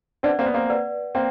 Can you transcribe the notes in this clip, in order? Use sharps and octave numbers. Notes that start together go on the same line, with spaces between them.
C4 D4 B4 D5 F#5
A#3 C4
B3
A#3 C4
B4 D5 F#5
A#3 C4 G5